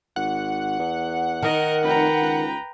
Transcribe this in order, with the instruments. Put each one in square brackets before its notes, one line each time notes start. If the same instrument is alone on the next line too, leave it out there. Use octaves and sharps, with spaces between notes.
[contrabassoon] G#1 [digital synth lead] F#5
[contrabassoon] E2
[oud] D#3 [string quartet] A#4 D#5
[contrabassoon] F1 [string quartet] B4 G5 A#5
[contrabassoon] C#2